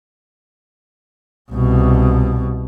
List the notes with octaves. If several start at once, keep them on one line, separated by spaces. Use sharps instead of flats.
C2 B2